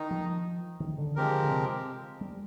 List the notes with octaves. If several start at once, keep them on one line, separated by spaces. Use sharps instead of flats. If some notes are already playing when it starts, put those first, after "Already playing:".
Already playing: D#3 D#4
F3
D#3
D3
F3 G#3 C4 G4 A#4
D3
C3
G3